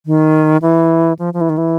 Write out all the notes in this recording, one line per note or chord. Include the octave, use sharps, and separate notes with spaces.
D#3
E3
F3
F3
E3
D#3
E3